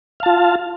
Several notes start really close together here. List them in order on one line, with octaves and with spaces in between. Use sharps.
F5 A5 F4